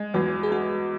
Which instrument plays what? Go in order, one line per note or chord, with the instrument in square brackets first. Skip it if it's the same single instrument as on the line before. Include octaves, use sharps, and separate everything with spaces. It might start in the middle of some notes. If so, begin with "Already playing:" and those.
Already playing: [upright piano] G#3
[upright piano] E2 [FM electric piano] F#4
[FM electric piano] G#4
[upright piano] G#3 [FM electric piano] F#4